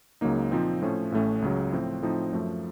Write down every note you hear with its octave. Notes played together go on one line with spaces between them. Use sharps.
C#2 C#3 F#3 A#3 D#4
A#2 F3 C4 D#4
A2 F3 A3 C#4
A1 A2 A3 C#4
C#2 C#3 F#3
A2 F3 C4
A2 F3 C4 D#4
F#2 F3 A3